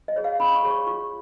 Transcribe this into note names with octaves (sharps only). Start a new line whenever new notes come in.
D#5
G#4 C#5
F5
C#4 B5
C#6
G#4 C#5
C#6
F4 C#6